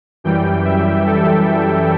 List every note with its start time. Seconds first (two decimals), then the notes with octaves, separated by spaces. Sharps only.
0.24 F#2 E3 G3 G5
0.65 E5
1.06 A4